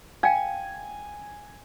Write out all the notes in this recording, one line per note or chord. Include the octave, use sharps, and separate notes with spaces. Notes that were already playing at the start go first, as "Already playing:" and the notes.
F5 G5 G#5